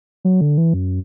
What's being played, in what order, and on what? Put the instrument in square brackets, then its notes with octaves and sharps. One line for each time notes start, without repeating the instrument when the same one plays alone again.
[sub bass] F#3
D3
E3
F#2